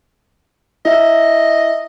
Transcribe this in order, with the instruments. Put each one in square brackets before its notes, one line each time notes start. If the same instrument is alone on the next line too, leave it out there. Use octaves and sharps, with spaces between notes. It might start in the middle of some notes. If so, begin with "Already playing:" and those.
[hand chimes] E4 E5 [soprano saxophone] D#5